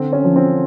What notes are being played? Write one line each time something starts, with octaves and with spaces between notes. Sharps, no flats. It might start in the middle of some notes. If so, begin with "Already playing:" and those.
Already playing: D3 C4
C#4
F3
C4